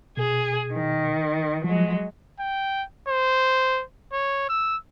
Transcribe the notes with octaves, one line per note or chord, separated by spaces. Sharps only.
B2 G#4
D#3
F3 F#3 G#3
G5
C5
C#5
E6